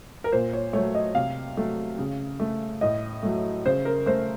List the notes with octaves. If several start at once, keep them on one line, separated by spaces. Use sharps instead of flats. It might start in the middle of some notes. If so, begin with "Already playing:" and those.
A#4
A#2 C5
C#5
F#3 A3 C#5
D#5
C3 F5
F#3 A3
C#3
A3
A2 D#5
F#3 A3
C#3 C5
A#4
A3 C5